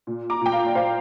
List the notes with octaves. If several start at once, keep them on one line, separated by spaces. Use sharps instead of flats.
A#2
A#5 D6
A#2 G5
F5 A#5
D5
A#2 C5 F5